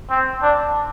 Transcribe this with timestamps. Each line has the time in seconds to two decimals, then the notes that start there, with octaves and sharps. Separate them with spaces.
0.10 C4
0.42 D4